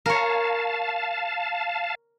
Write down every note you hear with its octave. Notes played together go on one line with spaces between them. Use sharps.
A#4 C#5 F5 A5